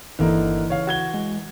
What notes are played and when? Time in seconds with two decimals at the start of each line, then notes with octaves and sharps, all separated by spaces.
0.19 G1 D3 E3 A#3 D#4
0.70 C#3 C#5 F5
0.87 F#4 G#6 G7
1.14 G#3